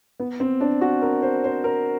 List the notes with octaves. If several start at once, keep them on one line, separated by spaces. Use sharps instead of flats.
B3
C4
D4
F#4
A#4
C5
C5
A#4